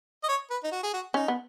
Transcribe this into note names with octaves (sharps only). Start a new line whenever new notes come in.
D#5
C#5
B4
D#4
F#4
G#4
F#4
C#4 D#4
B3